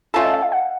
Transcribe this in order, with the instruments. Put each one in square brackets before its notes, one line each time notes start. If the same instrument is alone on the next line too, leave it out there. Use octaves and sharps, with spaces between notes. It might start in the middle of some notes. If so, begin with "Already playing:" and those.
[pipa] A3 C#4 F4 A4 [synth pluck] A5
[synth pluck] D#5
E5
F5
F#5